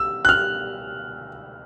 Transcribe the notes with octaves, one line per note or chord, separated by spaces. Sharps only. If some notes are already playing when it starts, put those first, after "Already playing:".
Already playing: E6
F#6
F6